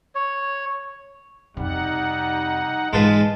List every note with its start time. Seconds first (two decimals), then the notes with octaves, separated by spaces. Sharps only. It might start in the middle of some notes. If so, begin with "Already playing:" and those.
0.15 C#5
1.57 F2 C3 G3 D#4 F#5
2.93 G#2 E3 G#3 F4 B4 A5